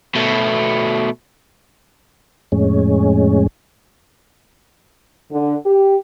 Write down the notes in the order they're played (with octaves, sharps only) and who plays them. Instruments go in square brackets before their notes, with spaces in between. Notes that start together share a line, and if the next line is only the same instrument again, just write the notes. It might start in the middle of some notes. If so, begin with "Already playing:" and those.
[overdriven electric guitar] B2 A3
[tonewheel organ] F2 A2 G#3 C#4
[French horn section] D3
G4